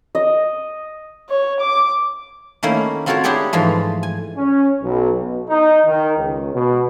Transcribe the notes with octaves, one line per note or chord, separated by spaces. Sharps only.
D#5
C#5
D6
D#3 A3 A#3 C#4 E4
C4 F4 F#4 A4 A#4 C#5
D4 E4 G4 G#4 C#5 G5
G#2 E3 F3 A3
G#5
C#4
B1
B2
D#4
D#3
C#2
B2